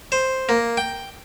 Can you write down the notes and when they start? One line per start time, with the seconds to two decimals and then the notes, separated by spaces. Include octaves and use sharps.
0.12 C5
0.49 A#3
0.77 G5